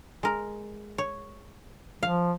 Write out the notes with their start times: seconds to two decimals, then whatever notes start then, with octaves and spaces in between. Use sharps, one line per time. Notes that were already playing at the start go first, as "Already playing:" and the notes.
0.23 G#3 A#4
0.98 C#5
2.03 F3 F5